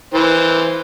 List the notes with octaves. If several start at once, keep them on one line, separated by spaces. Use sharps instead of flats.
E3 C5